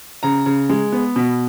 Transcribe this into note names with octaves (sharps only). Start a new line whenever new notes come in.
C#3 A#5
C#3
G#3
B3
B2